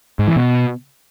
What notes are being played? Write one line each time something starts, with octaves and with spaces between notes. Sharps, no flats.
G#2
E3
B2